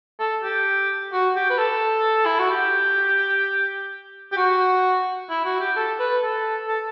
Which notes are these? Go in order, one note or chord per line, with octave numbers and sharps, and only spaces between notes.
A4
G4
F#4
G4
B4
A4
E4
F#4
G4
G4
F#4
E4
F#4
G4
A4
B4
A4
A4